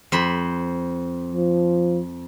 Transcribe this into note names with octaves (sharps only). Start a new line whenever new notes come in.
F2 C5 B5
F3